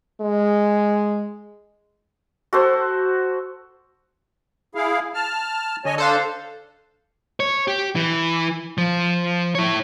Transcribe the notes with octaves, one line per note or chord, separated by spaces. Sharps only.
G#3
F#4 A4 C5
E4 G#4 F5
A5 F6
D3 C#5 D#5 G#5
D4 A4 C5 F5
C#5
G4
E3
F3
E4 C#5